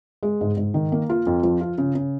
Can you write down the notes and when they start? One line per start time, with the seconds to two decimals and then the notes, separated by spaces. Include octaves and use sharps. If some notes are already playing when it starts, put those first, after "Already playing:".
0.23 G#3
0.41 G#2
0.57 G#2
0.74 D#3
0.92 A#3
1.09 F4
1.27 F2
1.43 F3
1.61 F4
1.78 C#3
1.95 C#3